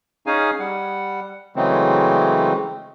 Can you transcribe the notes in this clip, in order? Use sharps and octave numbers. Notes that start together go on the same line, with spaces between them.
C#4 D#4 G#4 F5 G#5
G3 F#5
C#3 E3 F#3 G#3 A3 C4